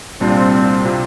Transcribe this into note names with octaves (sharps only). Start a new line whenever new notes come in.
C2 A#2 G3 C4 D4 F4
C3 G3 C4 F4